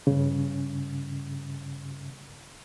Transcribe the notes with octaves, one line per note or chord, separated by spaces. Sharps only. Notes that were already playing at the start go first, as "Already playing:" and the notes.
G2 C#3